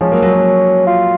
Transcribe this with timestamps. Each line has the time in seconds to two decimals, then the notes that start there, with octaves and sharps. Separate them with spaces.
0.01 F3 G#3 C#4
0.12 F#3 A#3
0.22 F#3 A#3
0.33 F#3 A#3
0.87 F4